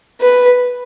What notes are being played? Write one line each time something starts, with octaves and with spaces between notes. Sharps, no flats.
B4